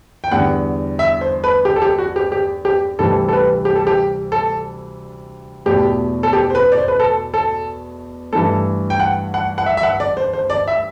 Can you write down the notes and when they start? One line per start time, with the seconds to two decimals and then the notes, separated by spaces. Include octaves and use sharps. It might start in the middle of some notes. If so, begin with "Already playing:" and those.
0.24 G5
0.31 E2 D3 G3 F#5
0.99 E5
1.21 C5
1.44 B4
1.65 G4
1.76 A4
1.82 G4
1.99 F#4
2.16 G4
2.32 G4
2.65 G4
2.99 D2 C3 E3 G3 A4
3.28 A4
3.33 B4
3.65 G4
3.76 A4
3.87 G4
4.32 A4
5.66 E2 B2 A3 G4
6.23 A4
6.33 G4
6.50 C5
6.55 B4
6.72 D5
6.78 C5
6.88 B4
7.00 A4
7.34 A4
8.33 G2 E3 A3 A4
8.90 G5
9.00 F#5
9.34 F#5
9.58 F#5
9.66 E5
9.77 E5
9.83 F#5
10.00 D5
10.17 C5
10.33 C5
10.50 D5
10.68 E5